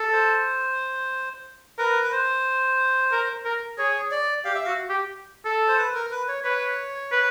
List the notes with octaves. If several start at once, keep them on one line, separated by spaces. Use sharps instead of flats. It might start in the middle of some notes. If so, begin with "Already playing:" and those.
Already playing: A4
C5
A#4 B4
B4
C5
A#4
A#4
G#4 C#5
D5
G4 F5
E5
F#4 F5
G4
A4
C5
B4
A#4
B4
C#5
B4 C#5
B4